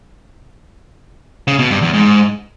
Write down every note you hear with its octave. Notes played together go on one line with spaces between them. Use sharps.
C#3
B2
G2
E2
G#2